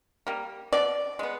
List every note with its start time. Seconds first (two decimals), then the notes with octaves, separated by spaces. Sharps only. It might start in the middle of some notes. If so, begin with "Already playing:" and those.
0.27 G3 A#3
0.73 B2 D5
1.19 G#3 B3